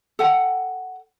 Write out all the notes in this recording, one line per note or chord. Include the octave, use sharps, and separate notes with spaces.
A4 F#5 G5